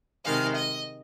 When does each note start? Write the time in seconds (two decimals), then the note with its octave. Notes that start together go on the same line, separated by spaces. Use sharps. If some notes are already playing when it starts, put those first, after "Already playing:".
0.24 C3 D#3 G#3 F5
0.56 D#5